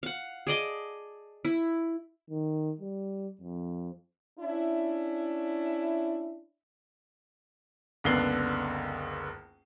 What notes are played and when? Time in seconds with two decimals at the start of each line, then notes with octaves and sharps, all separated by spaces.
0.03 F5 F#5
0.47 G#4 D5 D#5 A5
1.45 E4
2.30 D#3
2.80 G3
3.41 F2
4.39 C#4 D4 E4
8.04 F#1 C#2 D3 B3 C7 G7